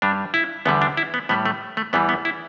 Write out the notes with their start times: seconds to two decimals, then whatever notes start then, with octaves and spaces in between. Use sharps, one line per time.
0.02 G2 G3 D4
0.34 E4
0.66 E2 D3 G3 B3
0.82 D4
0.97 E4
1.14 B3
1.29 A2 G3 B3
1.46 A3
1.77 A3
1.93 E2 E3 G3 B3
2.09 B3
2.25 E4